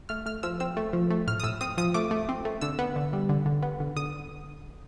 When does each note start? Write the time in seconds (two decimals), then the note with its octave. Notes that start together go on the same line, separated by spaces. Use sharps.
0.09 A3 F6
0.26 A3 F6
0.43 F3 E6
0.60 C4 E6
0.77 A3
0.93 F3
1.11 A3
1.27 A2 F6
1.40 D#6
1.44 A2 E6
1.61 C4 D#6
1.78 F3 D#6
1.94 A3 D6
2.11 A3
2.29 C4
2.45 A3
2.61 D3 E6
2.79 B3
2.96 D3
3.13 G3
3.29 D3
3.46 D3
3.63 B3
3.80 D3
3.96 D3 D#6